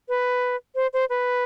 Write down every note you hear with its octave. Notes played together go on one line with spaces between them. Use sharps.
B4
C5
C5
B4